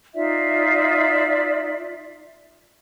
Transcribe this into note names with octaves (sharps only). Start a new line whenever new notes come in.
D#4 F4 D5 E5